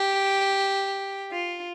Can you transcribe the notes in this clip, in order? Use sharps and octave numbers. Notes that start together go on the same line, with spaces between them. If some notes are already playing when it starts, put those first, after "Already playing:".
Already playing: G4
F4